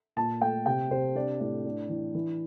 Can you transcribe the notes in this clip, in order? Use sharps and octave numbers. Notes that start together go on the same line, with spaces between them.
A#2 A5
A3 G5
C3 G5
C3 C5
D4 D5
A2 D5
D4
E3
E3